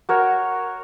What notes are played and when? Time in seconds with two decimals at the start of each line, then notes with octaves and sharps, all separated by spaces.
0.09 F#4 A#4 C#5